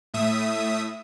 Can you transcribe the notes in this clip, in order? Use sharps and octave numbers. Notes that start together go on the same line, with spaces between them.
A2 E5 D#6